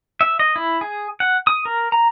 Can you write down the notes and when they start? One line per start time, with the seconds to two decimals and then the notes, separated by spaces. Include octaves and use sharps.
0.21 E5
0.39 D#5
0.56 E4
0.81 G#4
1.20 F#5
1.47 D#6
1.65 A#4
1.92 A#5